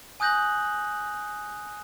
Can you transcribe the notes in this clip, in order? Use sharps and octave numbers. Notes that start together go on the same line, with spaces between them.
G#5 D#6 F#6 G6 A#6 F#7